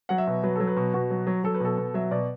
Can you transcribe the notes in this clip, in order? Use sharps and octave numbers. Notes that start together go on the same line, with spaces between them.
F#3 F#5
E5
B2
F#3 B4
F#3 A4
B4
B2
B2 F#4
F#3
F#3
F#3 A4
B4
B2 A4
B2
F#3 E5
B2 D5